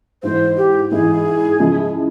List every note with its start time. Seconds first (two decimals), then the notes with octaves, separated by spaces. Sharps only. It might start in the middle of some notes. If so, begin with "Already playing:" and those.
0.23 G#2 E3 G#3 C5
0.57 G4
0.91 G#2 E3 G#3 G#4
1.60 C#3 F3 G#3 E4